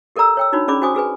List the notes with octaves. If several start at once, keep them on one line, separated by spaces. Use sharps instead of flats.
G4 A4 A#4 D5 A#5 E6
C#5 G5 E6
D4 D#4 F#4 C#5 B5
C#4 G#4 D5 B5 D6
C#4 F#4 C5 G#5 D6 D#6
F#4 G#4 B4 G#5